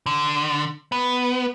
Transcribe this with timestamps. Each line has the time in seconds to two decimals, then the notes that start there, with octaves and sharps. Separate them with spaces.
0.06 D3
0.92 B3